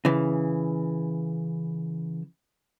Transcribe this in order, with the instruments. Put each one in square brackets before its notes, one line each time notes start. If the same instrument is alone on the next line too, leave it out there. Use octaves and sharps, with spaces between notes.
[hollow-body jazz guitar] C#3 E3